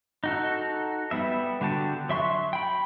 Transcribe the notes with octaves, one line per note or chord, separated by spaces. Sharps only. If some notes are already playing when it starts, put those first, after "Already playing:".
D#4 F#4 A4
G3 B3 E5
D3 F#4 G4 A5
F#3 E5 C6 C#6
G5 B5